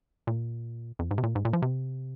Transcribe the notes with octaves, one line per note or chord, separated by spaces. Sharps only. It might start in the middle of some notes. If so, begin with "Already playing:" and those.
A#2
F2
G#2
C3
A#2
G#2
A#2
F3
C3